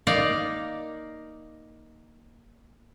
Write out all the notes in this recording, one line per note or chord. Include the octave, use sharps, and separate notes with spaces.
A#3 D#4 D5 F5